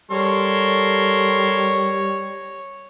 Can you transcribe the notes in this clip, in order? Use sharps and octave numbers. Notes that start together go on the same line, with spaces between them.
G3 A4 A#4 C#5 C6